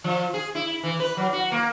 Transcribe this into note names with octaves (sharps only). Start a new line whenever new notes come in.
F3
G#4
E4
E3
B4
F#3
F#4
A#3